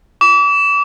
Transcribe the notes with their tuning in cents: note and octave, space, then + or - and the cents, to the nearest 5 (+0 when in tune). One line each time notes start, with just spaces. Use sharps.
D6 -35